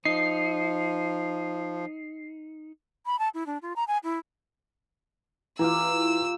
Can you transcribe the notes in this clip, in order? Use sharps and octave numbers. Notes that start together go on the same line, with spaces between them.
F3 D#4 C7
B5
A5
E4
D4
F4
A#5
G#5
E4
E3 F4 G4 A#5 E6